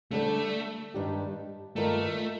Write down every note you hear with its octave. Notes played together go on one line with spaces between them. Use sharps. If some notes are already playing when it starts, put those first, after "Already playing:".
D3 G3 A3 D4 A4 D5
G2 D#3 G3 D4 G4
G2 D#3 A3 A#3 F4 A#4